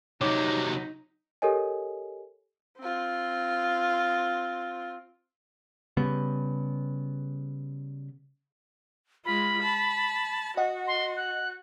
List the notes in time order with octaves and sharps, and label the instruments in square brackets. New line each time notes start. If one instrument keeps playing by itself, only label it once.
[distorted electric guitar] C3 F#3 [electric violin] D#4 [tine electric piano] C#5 D6
[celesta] G4 A4 A#4 C#5 D#5 G#5
[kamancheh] C4 F4
[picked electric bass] C#3 G3 B3
[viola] G#3 F4 [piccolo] B5
[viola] A5
[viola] F#4 [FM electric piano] D#5 F#5
[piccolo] C6
F#6